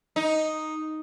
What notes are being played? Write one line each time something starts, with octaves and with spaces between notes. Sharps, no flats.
D#4